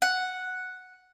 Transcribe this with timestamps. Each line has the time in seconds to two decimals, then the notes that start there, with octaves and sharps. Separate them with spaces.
0.02 F#5